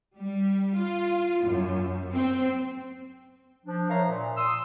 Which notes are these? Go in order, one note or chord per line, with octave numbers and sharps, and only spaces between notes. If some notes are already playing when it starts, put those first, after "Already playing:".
G3
F4
F#2
C4
F3 D4
A#4 C5 C#5 E5 F5 A#5
A#2
C6 D#6 E6